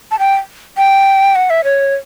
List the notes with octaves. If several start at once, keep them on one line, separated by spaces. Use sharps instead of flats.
A5
G5
G5
F#5
E5
C#5